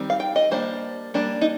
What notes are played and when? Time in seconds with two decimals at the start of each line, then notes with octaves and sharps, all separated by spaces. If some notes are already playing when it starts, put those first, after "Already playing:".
Already playing: D#3 G3 C4
0.10 F5
0.20 G5
0.36 D#5
0.51 G3 A#3 D4 C5
1.14 G3 A#3 D4
1.41 D#4